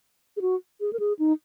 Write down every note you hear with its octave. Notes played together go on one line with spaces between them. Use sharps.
G#4
F#4
G#4
A#4
G#4
D#4